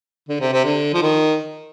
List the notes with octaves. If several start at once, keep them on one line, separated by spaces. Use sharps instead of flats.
D3
C3
C3
D3
F3
D#3